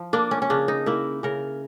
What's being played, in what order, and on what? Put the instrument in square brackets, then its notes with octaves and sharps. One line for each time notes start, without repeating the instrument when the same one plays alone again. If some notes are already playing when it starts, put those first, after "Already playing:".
Already playing: [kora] F3
A#3 D4
C#4
C#4
C#3 D4
D#4
A#3 E4
C#3 A#4